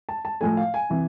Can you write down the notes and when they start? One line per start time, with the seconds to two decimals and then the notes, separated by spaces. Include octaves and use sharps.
0.09 A5
0.25 A5
0.41 A2 F3 A3 G#5
0.57 F5
0.74 G#5
0.90 C3 E3